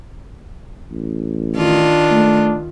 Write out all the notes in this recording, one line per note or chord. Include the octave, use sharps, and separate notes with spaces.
A1
D#3 D4 F4
A3